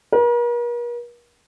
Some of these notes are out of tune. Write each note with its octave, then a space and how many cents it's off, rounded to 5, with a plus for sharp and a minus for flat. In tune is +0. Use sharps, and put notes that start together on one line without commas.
A#4 +45